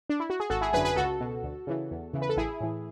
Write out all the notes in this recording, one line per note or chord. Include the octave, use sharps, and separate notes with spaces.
D4
E4
F#4
G#4
G#1 F#4 A4
E4 G#4
F#2 D3 G#4 B4
G#4 B4
C#2 F#4 A4
B2
D2
C#3 E3
E2
C#3 E3
B4
A4
A1 E4 G#4
A2 E3